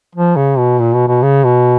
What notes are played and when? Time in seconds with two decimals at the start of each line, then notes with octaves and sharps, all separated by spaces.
0.15 F3
0.36 C#3
0.58 B2
0.80 A#2
0.94 B2
1.08 B2
1.23 C#3
1.44 B2